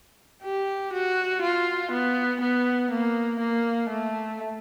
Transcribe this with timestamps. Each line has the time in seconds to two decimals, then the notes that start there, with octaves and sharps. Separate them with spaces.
0.43 G4
0.93 F#4
1.42 F4
1.91 B3
2.41 B3
2.91 A#3
3.40 A#3
3.90 A3